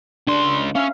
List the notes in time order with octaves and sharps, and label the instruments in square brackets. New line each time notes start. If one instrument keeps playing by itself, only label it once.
[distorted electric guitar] C#2 C6 [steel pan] D4
[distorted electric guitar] C#4 [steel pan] E5 F5